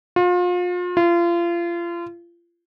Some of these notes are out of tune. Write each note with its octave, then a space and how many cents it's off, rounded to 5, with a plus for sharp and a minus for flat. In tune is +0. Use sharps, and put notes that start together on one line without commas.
F4 +35
F4 -30